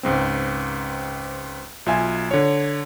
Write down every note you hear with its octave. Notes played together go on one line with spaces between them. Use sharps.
C#2 G#2 C4
B1 F4 E5 G#5
D3 C#5